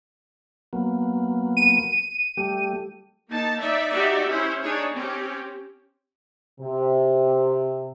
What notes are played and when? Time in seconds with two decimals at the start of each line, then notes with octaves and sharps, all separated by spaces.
0.73 F#3 A#3 B3
1.57 D#7
2.37 G3 A3 G4
3.29 A#3 D#4 A5
3.59 D#4 D5 E5
3.91 D#4 F#4 G4 D5 E5
4.31 C#4 E4 C5
4.62 D4 D#4 G#4 C#5
4.94 C4 C#4 G4
6.61 C3